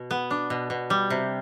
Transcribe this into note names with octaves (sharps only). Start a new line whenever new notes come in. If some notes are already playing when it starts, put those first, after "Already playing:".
Already playing: B2
B3
D4
B2
B2
G3
C3